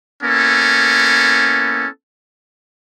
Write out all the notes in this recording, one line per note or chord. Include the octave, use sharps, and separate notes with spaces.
A#3 B3 C#4 E4 A4